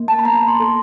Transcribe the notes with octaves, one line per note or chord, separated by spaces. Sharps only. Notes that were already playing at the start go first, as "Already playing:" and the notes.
Already playing: A#3
A5
B5
B3 A#5
C6
A4